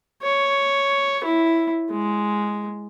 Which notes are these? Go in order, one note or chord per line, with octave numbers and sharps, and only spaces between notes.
C#5
E4
G#3